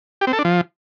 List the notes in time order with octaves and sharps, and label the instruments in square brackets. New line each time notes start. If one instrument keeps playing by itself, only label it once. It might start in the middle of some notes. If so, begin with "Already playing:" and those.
[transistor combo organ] G4
C4
A4
D4
F3